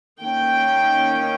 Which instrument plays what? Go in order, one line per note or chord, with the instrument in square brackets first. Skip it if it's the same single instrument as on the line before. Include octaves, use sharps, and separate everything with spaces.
[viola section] D#3 A#3 C#4 G5